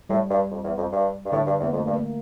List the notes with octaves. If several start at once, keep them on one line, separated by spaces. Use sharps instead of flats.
A2 G3
G2
F2
E2
F2
G2
G2
A2 D3
G2
E2
A#3
F2 A3
G2
A#3